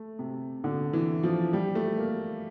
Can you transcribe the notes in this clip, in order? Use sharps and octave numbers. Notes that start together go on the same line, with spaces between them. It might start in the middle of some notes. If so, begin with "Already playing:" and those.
Already playing: A3
C3
D3
E3
F3
G3
A3
A#3